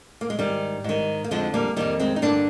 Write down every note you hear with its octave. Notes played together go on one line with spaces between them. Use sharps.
A#3
G#3
G#2 D#3 G3
G#2 D#3
A#3
F2 D3 F3 G#3
G3 A#3
F2 C3 D#3 G3 A#3
G#3 C4
D#4
G2 D3 A#3 D4